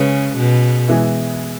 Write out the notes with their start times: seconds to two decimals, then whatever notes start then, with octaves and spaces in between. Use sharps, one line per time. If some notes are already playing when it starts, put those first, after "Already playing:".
Already playing: C#3 G#3 C#4 G#4 B4
0.37 B2
0.88 E3 G#3 B3 E4